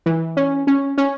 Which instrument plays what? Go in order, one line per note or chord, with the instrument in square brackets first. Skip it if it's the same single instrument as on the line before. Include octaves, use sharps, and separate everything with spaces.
[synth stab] E3
C#4
C#4
C#4